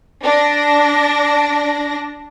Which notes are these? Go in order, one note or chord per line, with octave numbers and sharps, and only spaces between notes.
D4 A#6